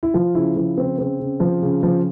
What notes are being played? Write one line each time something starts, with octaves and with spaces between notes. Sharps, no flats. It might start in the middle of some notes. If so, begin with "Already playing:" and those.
E4
F3 F4
C#3 E4
F3 E4
C#3 C4
C#3 C4
C#3
F3
C#3
F3